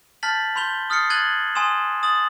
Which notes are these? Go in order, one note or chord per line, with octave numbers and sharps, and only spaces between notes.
A5 F6 G6 A6 B6 F#7
B5 C6 G6 F7 G7
D#6 F6 A6 C7 C#7
F#6 G#6 A6 D#7 F#7 G7
G#5 C6 D#6 E7
D#6 A6 F#7